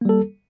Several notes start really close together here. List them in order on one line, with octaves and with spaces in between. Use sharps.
A#3 G3 A4